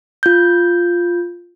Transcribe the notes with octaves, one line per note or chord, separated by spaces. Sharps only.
F4 G6